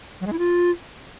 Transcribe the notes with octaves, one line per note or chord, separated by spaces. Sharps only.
F#3
G#3
E4
F4